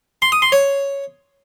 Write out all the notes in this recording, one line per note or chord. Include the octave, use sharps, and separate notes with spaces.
C6
D#6
C6
C#5